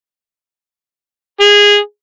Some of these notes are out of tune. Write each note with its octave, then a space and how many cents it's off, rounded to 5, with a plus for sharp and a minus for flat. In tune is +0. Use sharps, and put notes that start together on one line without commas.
G#4 -15